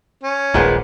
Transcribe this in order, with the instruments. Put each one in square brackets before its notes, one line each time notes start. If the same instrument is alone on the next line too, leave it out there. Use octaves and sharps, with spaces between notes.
[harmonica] C#4
[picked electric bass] D#1 A#1 [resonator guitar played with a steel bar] A#2 G#3 B3